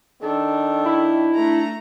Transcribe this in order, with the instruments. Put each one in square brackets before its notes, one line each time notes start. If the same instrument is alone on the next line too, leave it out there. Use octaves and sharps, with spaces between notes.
[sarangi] D#3 [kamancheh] D4 [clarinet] A4
[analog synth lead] E4
[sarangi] A3 [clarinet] D4 [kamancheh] A#5